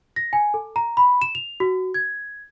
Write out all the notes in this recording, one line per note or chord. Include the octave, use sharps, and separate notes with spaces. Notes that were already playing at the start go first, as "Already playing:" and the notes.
A#6
G#5
A4
A#5
B5
E7
F7
F#4
G#6